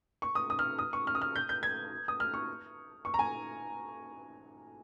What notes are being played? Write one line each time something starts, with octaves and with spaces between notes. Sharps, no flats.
C#6
D#6
D#6
F6
D#6
C#6
F6
D#6
F6
G6
G6
G#6
D#6
F6
C#6
C#6
A#5
G#5